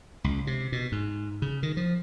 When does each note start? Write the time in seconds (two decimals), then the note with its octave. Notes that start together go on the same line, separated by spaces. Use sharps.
0.24 C#2
0.47 C3
0.72 B2
0.92 G#2
1.42 C#3
1.63 D#3
1.77 F3